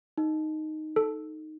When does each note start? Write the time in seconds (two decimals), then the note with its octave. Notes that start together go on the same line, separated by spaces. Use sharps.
0.18 D#4
0.96 A4